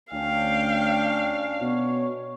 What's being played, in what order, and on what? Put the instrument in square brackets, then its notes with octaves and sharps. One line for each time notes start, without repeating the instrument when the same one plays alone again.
[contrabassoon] D2 [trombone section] C#4 D4 [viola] F5 [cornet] G5
[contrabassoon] B2 [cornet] C#5